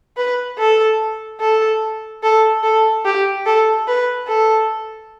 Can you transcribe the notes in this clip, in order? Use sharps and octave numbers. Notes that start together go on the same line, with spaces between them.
B4
A4
A4
A4
A4
G4
A4
B4
A4